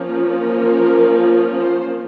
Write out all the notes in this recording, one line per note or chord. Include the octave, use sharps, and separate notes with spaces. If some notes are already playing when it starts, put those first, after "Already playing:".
Already playing: F3 A#3 C#4
A#4
C5